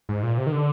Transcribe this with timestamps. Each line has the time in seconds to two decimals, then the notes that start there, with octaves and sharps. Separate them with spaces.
0.09 G#2
0.23 A#2
0.38 C3
0.47 D#3
0.52 D3